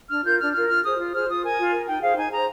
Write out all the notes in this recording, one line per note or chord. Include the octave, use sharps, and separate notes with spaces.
D4 F6
F4 A#4 G6
D4 F6
F4 A#4 F6
F4 F6
G#4 C5 D#6
F4
G#4 C5 F6
F4 D#6
A#4 G#5
F4
A#4
D#4 G5
G#4 C5 F5
D#4 G#5
G#4 C5 A#5